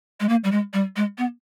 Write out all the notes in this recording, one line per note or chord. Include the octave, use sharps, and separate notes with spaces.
G#3
A#3
G3
G#3
G3
G#3
B3